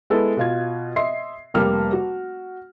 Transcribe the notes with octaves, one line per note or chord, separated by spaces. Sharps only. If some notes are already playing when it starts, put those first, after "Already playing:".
G#3 B3 E4 A4
B2 F4 G#6
D#5 E5 C6 C7
F1 G3 A#3 F6
F#4